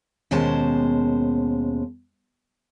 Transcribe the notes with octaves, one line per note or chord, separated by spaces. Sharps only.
D#2 B2 G#3 C#4 C5 A5